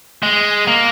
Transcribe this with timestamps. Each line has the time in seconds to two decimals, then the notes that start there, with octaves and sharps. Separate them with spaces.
0.23 G#3
0.67 A#3